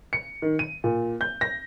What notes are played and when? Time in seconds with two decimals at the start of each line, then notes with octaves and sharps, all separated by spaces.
0.13 C#7
0.42 D#3
0.59 D#7
0.84 A#2
1.21 G6
1.41 A#6